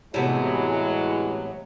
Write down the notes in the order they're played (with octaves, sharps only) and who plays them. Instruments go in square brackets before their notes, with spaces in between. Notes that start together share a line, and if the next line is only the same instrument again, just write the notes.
[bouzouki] A2 C3 B3 [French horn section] E3 F#3 G#3